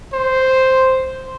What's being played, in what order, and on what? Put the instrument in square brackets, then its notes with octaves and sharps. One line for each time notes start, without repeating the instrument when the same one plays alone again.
[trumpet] C5